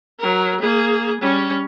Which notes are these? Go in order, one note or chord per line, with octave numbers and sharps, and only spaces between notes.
F#3 A#4
A#3 G#4
G3 C#4